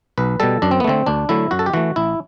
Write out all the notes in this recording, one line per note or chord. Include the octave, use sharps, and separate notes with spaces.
B1 B4
B2 G3 A4
F#2 D4
C4
B3
D3 A3 C4
D2 D4
D3 F#3 A3 E4
F#2 F#4
A4
G4
E3 A3 F#4
A1 E4